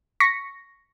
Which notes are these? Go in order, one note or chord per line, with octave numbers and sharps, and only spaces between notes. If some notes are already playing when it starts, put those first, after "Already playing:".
C#6 A#6 B6 C#7